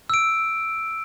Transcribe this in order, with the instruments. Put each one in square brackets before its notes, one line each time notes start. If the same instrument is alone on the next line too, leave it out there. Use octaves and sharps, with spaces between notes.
[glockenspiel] E6 D7